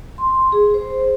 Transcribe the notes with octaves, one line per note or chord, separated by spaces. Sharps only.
C6
G#4
C5